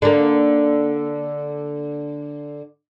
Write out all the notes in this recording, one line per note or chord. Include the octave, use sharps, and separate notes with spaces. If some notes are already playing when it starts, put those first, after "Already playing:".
D3 A#3